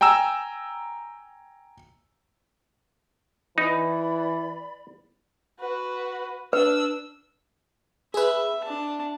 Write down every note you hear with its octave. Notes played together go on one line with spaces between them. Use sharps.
G5 G#5 A#5 E6 E7
E3 D#4 D5 B5
F#4 B4
D4 B4 E6
G#4 B4 E5
D4 A5